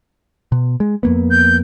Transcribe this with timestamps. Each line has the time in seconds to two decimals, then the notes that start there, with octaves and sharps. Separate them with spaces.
0.52 B2
0.80 G#3
1.03 F2 A#3 B3
1.30 G6